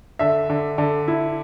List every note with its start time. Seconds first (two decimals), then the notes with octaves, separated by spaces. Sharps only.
0.19 D3 E5
0.50 D3
0.78 D3
1.08 E4